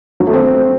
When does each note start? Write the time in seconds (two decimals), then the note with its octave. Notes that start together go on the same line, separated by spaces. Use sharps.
0.20 F#3
0.27 A3
0.33 C4